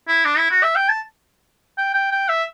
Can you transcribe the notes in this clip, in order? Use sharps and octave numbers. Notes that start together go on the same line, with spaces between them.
E4
D4
E4
F#4
E5
G5
A5
G5
G5
G5
E5